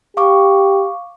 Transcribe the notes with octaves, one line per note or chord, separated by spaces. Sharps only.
G4 F5 C#6 D6